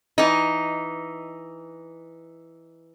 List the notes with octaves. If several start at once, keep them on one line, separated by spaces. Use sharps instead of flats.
E3 D#4